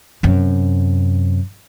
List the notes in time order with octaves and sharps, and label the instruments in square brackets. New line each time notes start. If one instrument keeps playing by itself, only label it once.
[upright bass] F#2 C3